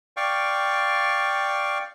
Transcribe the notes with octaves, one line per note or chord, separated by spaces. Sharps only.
D5 F5 G5 C#6